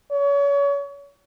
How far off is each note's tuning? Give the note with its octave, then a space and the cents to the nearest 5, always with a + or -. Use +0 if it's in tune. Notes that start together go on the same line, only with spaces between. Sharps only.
C#5 +35